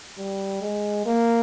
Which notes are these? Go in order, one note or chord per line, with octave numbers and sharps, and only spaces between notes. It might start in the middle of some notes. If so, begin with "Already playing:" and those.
G3
G#3
A#3